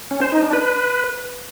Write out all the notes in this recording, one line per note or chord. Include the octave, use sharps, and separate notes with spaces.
C#4
C5
D#4
D4
B4